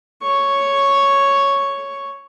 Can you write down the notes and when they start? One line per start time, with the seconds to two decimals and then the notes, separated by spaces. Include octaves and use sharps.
0.22 C#5 C#6